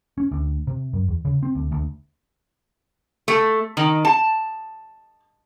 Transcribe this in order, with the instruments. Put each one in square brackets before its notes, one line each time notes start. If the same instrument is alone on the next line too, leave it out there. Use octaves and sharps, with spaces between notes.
[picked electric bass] C#4
D2
C3
F#2
E2
C#3
C4
D2
D2
[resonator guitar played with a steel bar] A3
D#3
A5